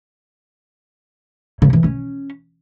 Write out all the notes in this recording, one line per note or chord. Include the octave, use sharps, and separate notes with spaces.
C#3
E3
C#4